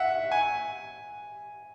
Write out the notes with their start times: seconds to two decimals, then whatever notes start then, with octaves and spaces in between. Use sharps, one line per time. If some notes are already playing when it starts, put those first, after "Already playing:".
Already playing: E5 F#5
0.32 G#5